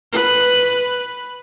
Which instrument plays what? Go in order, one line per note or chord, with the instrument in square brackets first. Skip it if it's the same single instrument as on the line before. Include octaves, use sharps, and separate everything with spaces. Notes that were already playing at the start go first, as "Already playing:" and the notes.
[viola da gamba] B4